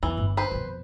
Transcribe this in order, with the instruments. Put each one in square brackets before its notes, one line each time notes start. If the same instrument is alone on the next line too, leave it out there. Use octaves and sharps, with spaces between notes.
[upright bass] E2 [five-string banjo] E3
[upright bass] G1
[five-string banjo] B4 C5
[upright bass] F2 B2